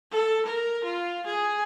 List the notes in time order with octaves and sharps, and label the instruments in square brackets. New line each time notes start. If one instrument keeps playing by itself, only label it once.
[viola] A4
A#4
F4
G#4